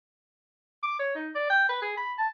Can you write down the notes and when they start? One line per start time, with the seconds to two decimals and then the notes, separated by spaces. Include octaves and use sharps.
0.83 D6
0.99 C#5
1.15 D#4
1.35 D5
1.50 G5
1.69 B4
1.82 G#4
1.97 B5
2.18 A5